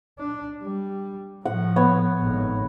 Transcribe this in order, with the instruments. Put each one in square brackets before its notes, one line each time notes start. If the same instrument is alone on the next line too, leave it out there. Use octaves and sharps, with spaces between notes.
[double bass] D4
G3
[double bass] A2 F3 [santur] F#5
[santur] B3 C#5
[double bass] G#1 A2